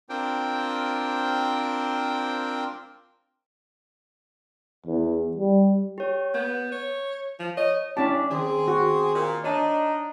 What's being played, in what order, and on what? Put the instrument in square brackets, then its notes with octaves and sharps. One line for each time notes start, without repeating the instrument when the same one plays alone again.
[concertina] C4 D4 F4 A#4 C5 G5
[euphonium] E2
G3
[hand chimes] G4 C#5
[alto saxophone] B3 [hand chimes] G6
[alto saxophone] C#5
F3
[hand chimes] C#5 [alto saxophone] D#5
[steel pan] C#4 A5 [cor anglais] D4 [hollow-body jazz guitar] E4 G4
[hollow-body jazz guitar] D#3 [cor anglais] C4 [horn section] G#4
[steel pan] F#4
[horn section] A#2
[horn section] D4 [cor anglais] D#4 [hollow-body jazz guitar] C#5 D#5 A5